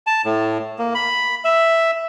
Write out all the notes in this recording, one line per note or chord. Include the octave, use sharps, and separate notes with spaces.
A5
A2
A#3
B5
E5